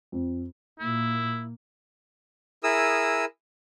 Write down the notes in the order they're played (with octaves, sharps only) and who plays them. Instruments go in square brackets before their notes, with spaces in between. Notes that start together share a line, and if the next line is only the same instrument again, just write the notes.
[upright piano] F2
[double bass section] A#2 A#3 [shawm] E4
[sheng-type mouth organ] E4 G#4 A#4 D#6 E6